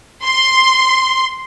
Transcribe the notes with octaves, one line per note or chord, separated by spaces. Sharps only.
C6